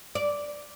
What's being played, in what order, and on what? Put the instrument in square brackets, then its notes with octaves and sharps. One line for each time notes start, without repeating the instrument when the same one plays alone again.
[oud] D5